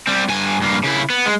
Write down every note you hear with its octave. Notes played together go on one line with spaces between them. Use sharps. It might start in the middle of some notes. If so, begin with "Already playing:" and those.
G3 C4
G2 G#5
G2 A#3
C#3 E4
B3
G#3